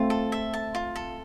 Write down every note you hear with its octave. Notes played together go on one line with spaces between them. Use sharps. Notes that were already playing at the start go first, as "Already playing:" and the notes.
Already playing: A3 C4 F4
A4
E5
A5
F4
A4